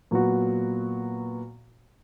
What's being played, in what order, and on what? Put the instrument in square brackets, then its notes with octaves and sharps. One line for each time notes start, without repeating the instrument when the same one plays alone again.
[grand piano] A#2 F#3 B3 F#4